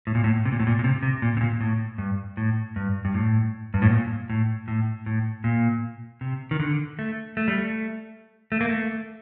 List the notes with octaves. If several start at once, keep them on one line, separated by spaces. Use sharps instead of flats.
A2
A#2
A2
C3
A#2
A2
A#2
A#2
C3
C3
A#2
C3
A#2
A2
G2
A2
G2
G2
A2
G2
A2
A#2
A2
A2
A2
A#2
C3
D#3
D3
A3
A3
G3
A3
A3
A#3
A3